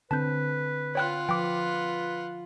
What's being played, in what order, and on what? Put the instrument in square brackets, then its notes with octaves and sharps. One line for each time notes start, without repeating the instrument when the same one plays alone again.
[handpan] D3 C4 [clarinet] B4 [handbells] A5 G6
[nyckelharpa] F4 F#5 [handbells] C#5 G5 F#6
[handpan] F3 [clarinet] B4 [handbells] G5 D6